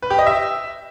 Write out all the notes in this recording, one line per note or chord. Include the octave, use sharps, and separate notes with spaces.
B4
G4
D#5
E5